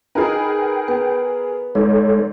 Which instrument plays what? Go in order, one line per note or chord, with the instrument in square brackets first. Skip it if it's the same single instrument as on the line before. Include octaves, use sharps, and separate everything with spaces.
[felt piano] D#4 [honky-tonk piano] G#4 A#4 B4 [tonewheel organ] G5
[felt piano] B3
[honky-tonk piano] G#2 [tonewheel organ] G#3 A4 C#5